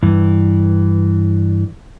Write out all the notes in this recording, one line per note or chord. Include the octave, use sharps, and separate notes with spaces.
G2 E3